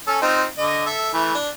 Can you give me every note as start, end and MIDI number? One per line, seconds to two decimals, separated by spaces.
0.07 0.21 61
0.07 0.21 69
0.22 0.44 60
0.22 0.44 63
0.22 0.44 65
0.58 0.86 50
0.58 0.86 75
0.86 1.12 69
0.86 1.12 76
1.13 1.34 52
1.13 1.34 57
1.35 1.49 62